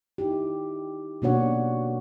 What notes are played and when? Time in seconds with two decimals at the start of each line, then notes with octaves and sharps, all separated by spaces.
0.18 D#4 E4 G4
1.22 B2 A#3 D4 F#4 C#5 F#5